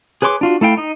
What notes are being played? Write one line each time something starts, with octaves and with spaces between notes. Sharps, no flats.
G#4 B4 C#5 C6 D6
D4 F4 F#4
A3 E4 F5 G5
D#4 D#5